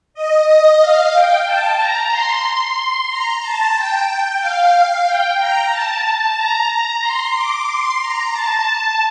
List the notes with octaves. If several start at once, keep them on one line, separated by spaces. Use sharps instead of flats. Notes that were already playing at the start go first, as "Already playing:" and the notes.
D#5
D#5
F5
G5
A5
A#5
C6
A#5
A5
G5
F5
G5
A#5
A5
A#5
A#5
C6
D6
C6
A#5
A5